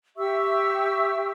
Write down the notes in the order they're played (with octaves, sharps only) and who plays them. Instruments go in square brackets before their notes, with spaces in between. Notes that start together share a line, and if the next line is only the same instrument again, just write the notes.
[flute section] G4 E5 C#6 E6